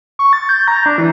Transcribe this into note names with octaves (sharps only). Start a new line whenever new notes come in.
C#6
A6
G6
A#5
D4
E3